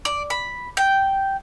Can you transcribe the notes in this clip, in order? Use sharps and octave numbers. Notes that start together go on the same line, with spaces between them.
D5
B5
G5